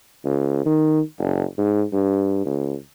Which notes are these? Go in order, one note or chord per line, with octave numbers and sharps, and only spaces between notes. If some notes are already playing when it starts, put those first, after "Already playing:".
C#2
D#3
F#1
G#2
G2
C#2